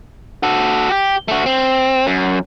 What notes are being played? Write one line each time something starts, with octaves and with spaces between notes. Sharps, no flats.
F#4 A4
G4
A3 F#4
C4
F#2